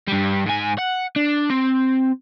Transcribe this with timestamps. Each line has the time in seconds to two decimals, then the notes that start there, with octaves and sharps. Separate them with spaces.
0.08 G2 G3
0.46 G#2 G#5
0.78 F#5
1.16 D4
1.50 C4